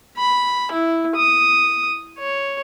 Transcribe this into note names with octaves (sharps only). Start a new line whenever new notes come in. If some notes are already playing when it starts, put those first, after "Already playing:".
B5
E4
D#6
C#5